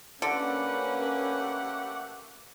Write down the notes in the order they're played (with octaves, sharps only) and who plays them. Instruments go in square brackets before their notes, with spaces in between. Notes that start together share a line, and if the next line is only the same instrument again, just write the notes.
[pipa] D3 [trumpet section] A3 G4 F#5 [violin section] A#3 C#4 B4